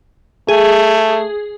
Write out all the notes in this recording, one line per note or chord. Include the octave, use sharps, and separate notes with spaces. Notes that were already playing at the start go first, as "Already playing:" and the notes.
A3 G#4